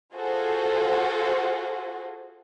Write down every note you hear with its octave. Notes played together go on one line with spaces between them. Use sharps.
F4 F#4 G#4 A4 C5